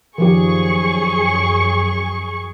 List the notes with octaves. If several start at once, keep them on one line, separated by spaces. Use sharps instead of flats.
F#2 D#3 F3 G4 G#4 C#6